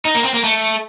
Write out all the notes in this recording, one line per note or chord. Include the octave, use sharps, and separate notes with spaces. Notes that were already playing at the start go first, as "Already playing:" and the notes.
D#4
A#3
C4
A#3
A3